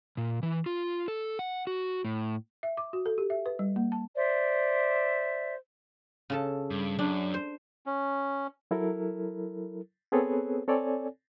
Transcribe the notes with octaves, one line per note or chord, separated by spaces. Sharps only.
A#2
E3
F4
A4
F#5
F#4
A2
E5
D6
F#4
A4
G4
E5
B4
G3
A#3
A5
C5 D5 E5
C#3 A4 A5
G2
F#2 D4
C5
C#4
F#3 E4 A4 A#4
B3 C4 G#4 A4 B4 C#5
C4 A4 C#5 D5 G#5